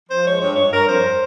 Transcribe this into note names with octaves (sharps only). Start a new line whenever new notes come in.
F3 C5
G#3 C#5
G2 C#5
G2 C#5
G2 A#4
F2 C5